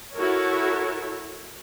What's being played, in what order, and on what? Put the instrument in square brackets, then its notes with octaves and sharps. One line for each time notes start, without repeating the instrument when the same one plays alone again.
[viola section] E4 F#4 A4 A#4 C#5